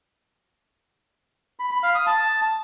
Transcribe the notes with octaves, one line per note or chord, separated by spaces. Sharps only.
B5
B5
F5
D#6
A5